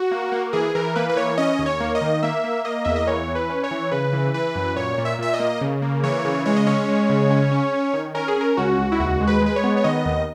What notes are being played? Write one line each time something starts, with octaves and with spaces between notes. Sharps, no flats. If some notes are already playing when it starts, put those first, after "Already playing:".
Already playing: F#4
A#3
A#3
E3 G#4
E3 A#4
A#3 B4
B4
E3 C#5
C#4 D#5
D#2
C#5
A#3
D#5
D#3
A#3 E5
A#3
A#3 D#5
E2 E5
D#5
E3 C#5
E3
B4
C#4
C#5
E3
C#3 B4
E3
E3 B4
F#2
A#2 C#5
A#2
E5
A#2 E5
D#5
A#3
C#3
A#3
E3 C#5
C#3
G#3 C#5
D#5
C#4 C#5
G#3
C#3
C#4
C#4
C#4
D#3
C#4 A#4
G#4
C#4 A#4
C#2 F#4
C#2
E4
D#2 F#4
G#3
B4
G#3 B4
C#5
B3
C#5
D#3 D#5
D#2